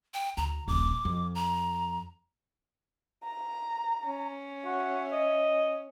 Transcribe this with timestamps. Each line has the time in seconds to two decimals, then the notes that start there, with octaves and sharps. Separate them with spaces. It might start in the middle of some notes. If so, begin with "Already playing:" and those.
0.14 G5
0.37 D2 A#5
0.68 D#1 A#1 D6
1.05 F2
1.35 A#5
3.24 A#5
4.05 C#4
4.66 F#4 E5
5.12 D#5